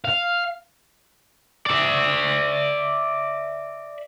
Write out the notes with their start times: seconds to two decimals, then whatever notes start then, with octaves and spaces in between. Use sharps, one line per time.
0.05 F5
1.66 D5 E5